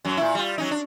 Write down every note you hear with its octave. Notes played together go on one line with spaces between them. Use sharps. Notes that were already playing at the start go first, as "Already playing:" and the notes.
F#2 F#3
A#2 E4
G3 F4
F#3 C#4 D#4
D4